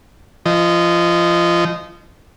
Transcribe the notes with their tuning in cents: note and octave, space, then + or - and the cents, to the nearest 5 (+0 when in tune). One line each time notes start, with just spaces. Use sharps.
F3 -25 D#5 -10